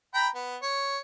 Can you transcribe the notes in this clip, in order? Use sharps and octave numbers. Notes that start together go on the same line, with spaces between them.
G5 A#5 B5
B3
C#5